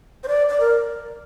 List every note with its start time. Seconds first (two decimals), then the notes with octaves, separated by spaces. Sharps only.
0.24 C5
0.28 D5
0.49 D5
0.60 A#4